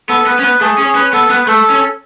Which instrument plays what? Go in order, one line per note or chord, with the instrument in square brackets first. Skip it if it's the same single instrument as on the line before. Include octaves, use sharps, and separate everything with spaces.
[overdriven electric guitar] B3 [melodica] A4
[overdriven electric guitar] B3 [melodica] B4
[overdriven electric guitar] C#4
[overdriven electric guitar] B3 [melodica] B4
[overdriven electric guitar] A3 [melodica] G#4
[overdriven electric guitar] C#4 [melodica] G#4
[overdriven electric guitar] C#4 [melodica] B4
[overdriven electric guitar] B3 [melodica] A4
[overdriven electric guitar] B3 [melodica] B4
[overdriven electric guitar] A3 [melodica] A4
[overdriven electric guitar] C#4